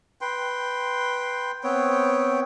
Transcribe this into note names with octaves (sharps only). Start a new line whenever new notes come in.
B4 G5 C6
B3 C4 C#5 G5